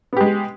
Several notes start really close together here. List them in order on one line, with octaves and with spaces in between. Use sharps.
B3 G4 G#3